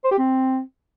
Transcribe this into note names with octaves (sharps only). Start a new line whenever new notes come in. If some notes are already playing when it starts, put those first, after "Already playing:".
C5
G4
C4